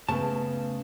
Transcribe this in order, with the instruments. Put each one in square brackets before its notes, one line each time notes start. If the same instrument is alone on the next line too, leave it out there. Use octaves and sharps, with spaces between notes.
[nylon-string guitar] C#3 B3 [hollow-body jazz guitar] A3 A5